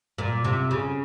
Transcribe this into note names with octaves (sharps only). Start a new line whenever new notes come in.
A#2
C3
C#3